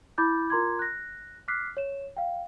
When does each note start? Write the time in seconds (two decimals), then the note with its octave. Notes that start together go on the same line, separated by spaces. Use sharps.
0.18 E4 B5 D6 G6 A6
0.50 F4 A#4 A#5 C6 D6 G#6
0.79 F#6 A#6
1.48 D6 F6 F#6 B6 C7
1.77 C#5 E7
2.17 F5 G5